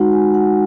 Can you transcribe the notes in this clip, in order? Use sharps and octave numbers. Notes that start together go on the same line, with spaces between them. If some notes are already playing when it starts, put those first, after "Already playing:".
Already playing: G#3 D#4 F#4 F#5
G#5
F#5